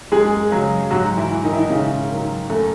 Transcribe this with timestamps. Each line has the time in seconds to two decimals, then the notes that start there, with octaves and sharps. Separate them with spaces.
0.12 F#2 G#3 G#4
0.51 C#3 F#3
0.90 G#2 F#3 F#4
1.17 E3 E4
1.31 E3
1.44 D#3 D#4
1.53 E4
1.62 D#4
1.70 G#2 C#3 C#4
2.10 D#3 F#3
2.50 F#2 A3